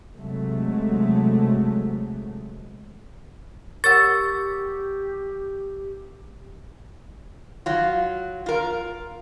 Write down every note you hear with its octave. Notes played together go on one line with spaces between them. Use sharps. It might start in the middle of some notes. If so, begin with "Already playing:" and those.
C3 F#3 G#3 A3
G4 A#4 C#5 F#5 C#6 E6 A6
F#3 F4
F4 A#4